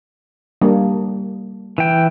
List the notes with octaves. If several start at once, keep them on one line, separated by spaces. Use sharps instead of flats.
G3 A#3 D4
E3 G5